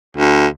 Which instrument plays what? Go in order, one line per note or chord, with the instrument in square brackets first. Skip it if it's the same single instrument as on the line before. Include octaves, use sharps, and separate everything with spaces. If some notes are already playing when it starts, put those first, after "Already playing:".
[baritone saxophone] D2